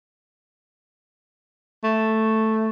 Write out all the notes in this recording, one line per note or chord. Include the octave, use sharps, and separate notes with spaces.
A3